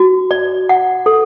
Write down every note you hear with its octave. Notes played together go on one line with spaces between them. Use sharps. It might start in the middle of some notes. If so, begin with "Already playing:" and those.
Already playing: F#4
D5
F#5
A4